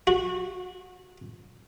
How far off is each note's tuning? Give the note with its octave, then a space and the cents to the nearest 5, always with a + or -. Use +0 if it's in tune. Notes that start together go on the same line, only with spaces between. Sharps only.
F#4 -25